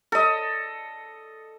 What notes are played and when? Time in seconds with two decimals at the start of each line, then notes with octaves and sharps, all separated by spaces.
0.12 A4 D#5